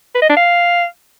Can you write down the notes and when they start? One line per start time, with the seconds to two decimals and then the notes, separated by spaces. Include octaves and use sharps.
0.15 B4
0.22 D#5
0.30 D4
0.37 F5